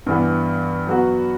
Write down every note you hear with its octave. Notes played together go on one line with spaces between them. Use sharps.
G2 E3 B3
F#3 B3 F#4